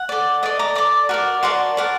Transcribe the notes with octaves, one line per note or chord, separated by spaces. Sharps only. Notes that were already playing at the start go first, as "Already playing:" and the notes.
Already playing: F#5
A4 D5
A4 D5 D#5
A#5 D6
A4 D5 A#5 D6
F#4 A#4 D5
F#4 A#4 D5 A5 C6
F#4 A#4 D5